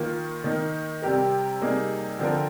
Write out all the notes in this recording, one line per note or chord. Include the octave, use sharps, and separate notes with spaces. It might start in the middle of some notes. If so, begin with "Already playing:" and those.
Already playing: D#3 A#3 F4
D#3 A#3 D#4
C3 G3 C4 G4 A#4
C3 G3 A#3 D#4 G#4
D3 F3 C4 F4 A#4